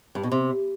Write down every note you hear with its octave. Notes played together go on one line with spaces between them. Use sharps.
G2
B2
C3